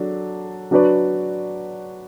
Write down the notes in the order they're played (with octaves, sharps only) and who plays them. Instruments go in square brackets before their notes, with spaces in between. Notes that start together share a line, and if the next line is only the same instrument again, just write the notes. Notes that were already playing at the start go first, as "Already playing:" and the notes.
Already playing: [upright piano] F#3 D4 A4
F#3 D4 F#4 B4 D5